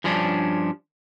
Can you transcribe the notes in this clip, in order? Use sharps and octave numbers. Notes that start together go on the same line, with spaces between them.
G2 F3 C#4 D4